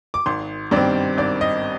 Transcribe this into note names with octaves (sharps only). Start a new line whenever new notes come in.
D6
G#1 C6
G2 D#3 G3 C4 D5
G#1 D5
D#5